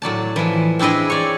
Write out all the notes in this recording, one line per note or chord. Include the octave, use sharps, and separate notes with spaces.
A2 F#3 D5 A5
E3 F3
C4 D4 E4 G#4 D#5
C#5 D5